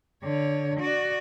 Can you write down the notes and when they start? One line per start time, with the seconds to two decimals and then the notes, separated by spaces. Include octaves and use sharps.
0.23 D3 C#5
0.80 F#4 D5